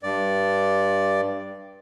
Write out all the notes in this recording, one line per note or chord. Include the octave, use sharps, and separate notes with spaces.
G2 D5